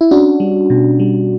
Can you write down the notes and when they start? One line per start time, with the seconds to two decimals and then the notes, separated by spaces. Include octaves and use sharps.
0.01 E4
0.11 C#4 D4 F#4
0.40 G3
0.70 B2
1.00 G3